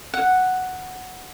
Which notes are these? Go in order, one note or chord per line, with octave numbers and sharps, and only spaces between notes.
F#5